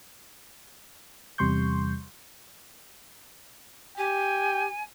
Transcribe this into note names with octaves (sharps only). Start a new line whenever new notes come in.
E2 C3 G3 C6 C#6 G6
G4 G5 G#5